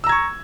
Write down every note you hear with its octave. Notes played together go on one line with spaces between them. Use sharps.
A#5 C#6 E6 G#6